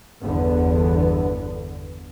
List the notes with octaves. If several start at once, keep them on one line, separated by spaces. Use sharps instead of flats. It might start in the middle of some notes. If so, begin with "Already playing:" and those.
G1 E2 D3 B3